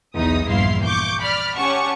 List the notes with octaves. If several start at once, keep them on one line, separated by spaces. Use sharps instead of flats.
B1 E2 D#4 D#6
A#1 E2 G2 E4 F5 C6
C#6 D6 G6
D5 B5 F6
C#4 G4 F#5 A5 C#6